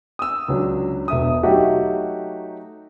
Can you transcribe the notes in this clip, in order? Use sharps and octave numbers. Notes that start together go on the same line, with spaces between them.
D#6 E6
C#2 F#3 D4
E1 E5 D#6
F#3 A3 D#4 F#4 G4 F#5